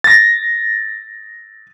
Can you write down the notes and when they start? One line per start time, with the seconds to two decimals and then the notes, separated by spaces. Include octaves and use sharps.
0.04 A6 A#6